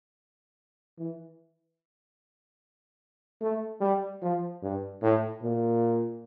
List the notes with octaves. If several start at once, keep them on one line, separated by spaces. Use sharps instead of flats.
E3
A3
G3
F3
G2
A2
A#2